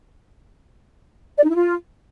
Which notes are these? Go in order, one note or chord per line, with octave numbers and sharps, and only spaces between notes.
D5
D#4
E4
F4